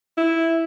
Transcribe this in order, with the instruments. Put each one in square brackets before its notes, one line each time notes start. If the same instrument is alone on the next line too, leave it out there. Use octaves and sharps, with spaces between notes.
[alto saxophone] E4